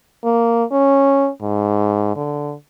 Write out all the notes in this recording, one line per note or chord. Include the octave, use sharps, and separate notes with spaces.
A#3
C#4
G#2
D3